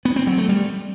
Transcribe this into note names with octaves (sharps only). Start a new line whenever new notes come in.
B3
C4
F#3
A3
G3